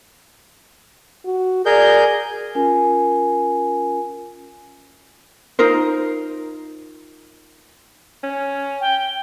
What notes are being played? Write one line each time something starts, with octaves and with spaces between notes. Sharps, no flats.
F#4
G#4 A#4 D5 G6
C#4 F4 A#4 G#5
D#4 F4 A#4 C5
C#4
G5